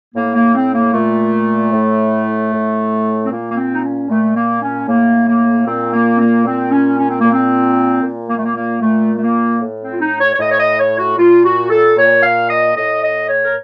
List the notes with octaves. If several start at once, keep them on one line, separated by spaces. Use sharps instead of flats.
A2 A#3
A#3
C4
A#3
A#2 A3
A2
A2
C4
A#2 A#3
A#3
C4
D#4
C#4
A#2 A3
A#3
C#4
A2 A#3
A#3
A#2 C4
A#3
C4
A#3
A#2 C4
C#4
C#4
C4
A#2 A#3
C4
A#2
A#3
A3
A#3
A#3
A#2 A3
A3
A#3
A2
C4
F4
D#4
C#5
C#5
A2 D#5
C#5
D#5
C#5
F#4
A#2 F4
F#4
A4
A#2 C#5
F5
D#5
A2 D#5
D#5
C#5
A#4